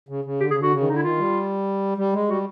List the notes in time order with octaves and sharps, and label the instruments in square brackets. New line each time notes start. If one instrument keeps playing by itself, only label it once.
[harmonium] C#3
C#3
[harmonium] D3 [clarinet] G4
[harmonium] C#3 [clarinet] G#4
[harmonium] D3 [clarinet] F#4
[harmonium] C#3
D#3
[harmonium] D3 [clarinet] D#4
[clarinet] E4
[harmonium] D#3 [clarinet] F4
[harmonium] G3
G3
G#3
[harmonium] G3 [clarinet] F#4